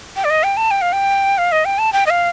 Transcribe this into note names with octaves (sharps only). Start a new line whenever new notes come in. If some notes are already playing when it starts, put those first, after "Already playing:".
G5
D5
D#5
G5
A5
G5
F5
G5
F5
D#5
G5
A5
G5
D#5
F5